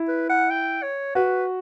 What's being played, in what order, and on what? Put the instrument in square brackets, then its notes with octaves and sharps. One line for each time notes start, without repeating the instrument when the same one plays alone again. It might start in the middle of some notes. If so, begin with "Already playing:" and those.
Already playing: [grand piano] E4
[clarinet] B4
F#5
G5
C#5
[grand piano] F#4 [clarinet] B4